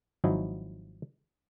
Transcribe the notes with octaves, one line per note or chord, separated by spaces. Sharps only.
G#1 F3 F#3 D#4 E4